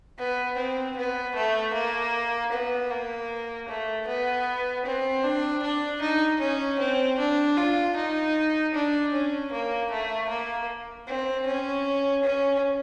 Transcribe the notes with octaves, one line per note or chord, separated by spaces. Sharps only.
B3
C4
B3
A3
A#3
B3
A#3
A3
B3
C4
D4
D4
D#4
C#4
C4
D4
F4
D#4
D4
C#4
A#3
A3
A#3
C4
C#4
C#4